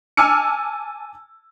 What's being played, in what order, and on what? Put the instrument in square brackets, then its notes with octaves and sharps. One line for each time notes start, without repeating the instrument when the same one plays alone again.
[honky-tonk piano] G#5 A5 D6 E6 F6 C#7